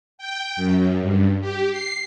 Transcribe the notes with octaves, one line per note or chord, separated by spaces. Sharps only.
G5
F#2
G2
G4
C7